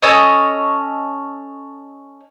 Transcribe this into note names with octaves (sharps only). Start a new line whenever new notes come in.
C#4 A4 C#5 D#5